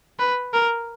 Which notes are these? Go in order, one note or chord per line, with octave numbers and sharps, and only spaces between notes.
B4
A#4